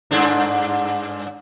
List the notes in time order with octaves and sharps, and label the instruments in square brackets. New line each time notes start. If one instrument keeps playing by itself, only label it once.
[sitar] G2 G#3 D4